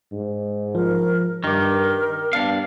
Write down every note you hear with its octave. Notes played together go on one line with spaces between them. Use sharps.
G#2
F3 A#4
G2 D#3 A#4 D6 F6
G2 B3 D4 F5